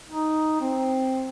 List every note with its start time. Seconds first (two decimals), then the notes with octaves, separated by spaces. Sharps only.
0.10 D#4
0.61 C4